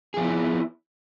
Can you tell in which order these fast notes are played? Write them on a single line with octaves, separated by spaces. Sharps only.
G#4 F3 B3 E4